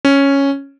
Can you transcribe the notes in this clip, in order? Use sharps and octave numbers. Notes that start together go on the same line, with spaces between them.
C#4